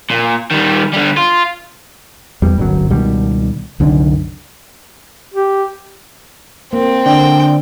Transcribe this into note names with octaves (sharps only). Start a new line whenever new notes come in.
A#2
D#3 G3
D3 G3
F4
E2 G3
D1 G1 F#2 F#3
C#2 B2 D#3 G3
C2 F#2 D3 D#3
G4
A#3 C4
D3 G5